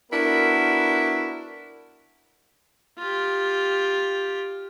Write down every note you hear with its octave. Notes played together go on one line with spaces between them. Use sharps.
B3 D4 E4 F#4 A#4
F4 G4